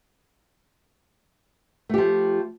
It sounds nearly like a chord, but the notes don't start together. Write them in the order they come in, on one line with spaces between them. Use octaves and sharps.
A3 G4 F3